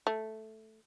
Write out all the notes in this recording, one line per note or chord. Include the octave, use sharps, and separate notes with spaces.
A3